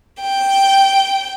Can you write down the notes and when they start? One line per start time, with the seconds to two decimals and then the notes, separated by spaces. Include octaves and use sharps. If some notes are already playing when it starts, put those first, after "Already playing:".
0.21 G5